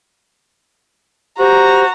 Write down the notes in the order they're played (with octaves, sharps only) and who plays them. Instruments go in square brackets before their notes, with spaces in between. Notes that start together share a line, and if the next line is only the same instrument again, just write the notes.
[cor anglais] F#4 [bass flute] G4 [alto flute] C5 [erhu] A#5